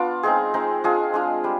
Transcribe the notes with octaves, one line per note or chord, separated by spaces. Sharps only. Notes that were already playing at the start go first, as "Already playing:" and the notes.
Already playing: B3 D4 F4 D5
G#3 C4 D#4 G#4
G#3 C4 D#4
G#3 D4 F4 G#4
G#3 D4 F4
G3